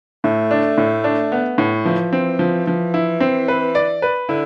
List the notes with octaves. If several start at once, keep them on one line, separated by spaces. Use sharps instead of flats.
A2 A3
D4
A2
D4
B3
A2
E3 F3
C4
F3
F3
E4
C4
B4
D5
B4
D3 E4